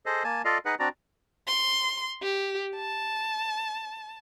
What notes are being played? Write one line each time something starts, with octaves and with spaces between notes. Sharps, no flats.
G#4 A4 C5 D#5
A#3 G#5 A5
F4 A4 D5 D#5 F5
D#4 G#4 B4 D#5 F#5
C4 D4 F#4 D5 A#5
C6
G4
A5